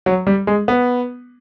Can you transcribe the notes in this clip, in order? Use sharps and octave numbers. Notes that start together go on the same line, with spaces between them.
F#3
G3
G#3
B3